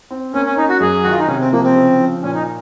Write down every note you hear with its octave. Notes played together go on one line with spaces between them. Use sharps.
C4
A#3 C#4
C#4
C#4 D#4
F#4
F#2 G#4
D#3 F#4
F4
D#4
C3 C#4
C4
F3 A#3
C4
C#3
F3
A#2 C#4
D#4